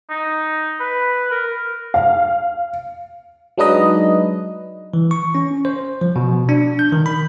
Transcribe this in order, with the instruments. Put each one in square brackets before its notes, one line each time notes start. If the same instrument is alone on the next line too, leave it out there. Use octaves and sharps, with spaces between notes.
[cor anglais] D#4
B4
A#4
[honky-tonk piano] F5
[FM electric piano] F#3 G#3 D4 D#4 B4 D#5
[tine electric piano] E3
C#6
C#4
C5
F3
B2
D4
G6
D#3
B5